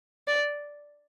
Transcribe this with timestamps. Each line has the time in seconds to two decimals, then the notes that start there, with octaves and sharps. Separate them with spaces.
0.28 D5